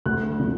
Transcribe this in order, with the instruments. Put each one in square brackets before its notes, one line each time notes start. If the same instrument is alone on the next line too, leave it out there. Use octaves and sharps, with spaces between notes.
[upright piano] D2 F#6
D3 F3 A3